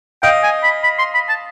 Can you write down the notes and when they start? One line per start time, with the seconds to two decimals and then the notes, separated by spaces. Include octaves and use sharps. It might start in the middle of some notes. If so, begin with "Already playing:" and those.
0.23 D#5 F5 G5
0.43 G#5
0.63 B5
0.84 B5
0.99 C6
1.14 B5
1.29 A5